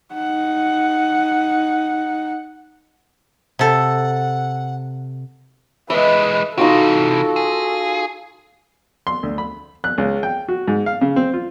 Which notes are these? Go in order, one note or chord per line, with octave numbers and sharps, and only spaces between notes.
D#4 F#5
C3 A4 F#5
E3 G#3 B4 D#5 E5
C3 E3 D#4 F4 F#4 A4
G#4
C6
D2
B5
F#6
C#2
G5
F#4
G#2
F5
C#3
C4
F4